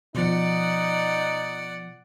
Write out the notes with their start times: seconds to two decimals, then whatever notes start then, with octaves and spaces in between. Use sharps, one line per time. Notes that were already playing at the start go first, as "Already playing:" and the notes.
0.15 B2 F3 D#4 D5 F#5